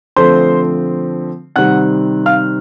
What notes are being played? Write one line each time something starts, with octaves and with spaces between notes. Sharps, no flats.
D3 F3 A3 C4 C5 C6
C3 D#3 G3 C4 F#5 F#6
F5 F6